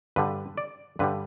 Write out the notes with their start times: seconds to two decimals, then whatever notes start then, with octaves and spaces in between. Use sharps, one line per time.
0.16 G2 D3 G3 B4
0.57 D5
0.99 G2 D3 G3 B4